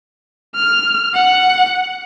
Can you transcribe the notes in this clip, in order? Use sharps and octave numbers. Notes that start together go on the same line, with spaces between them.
F6
F#5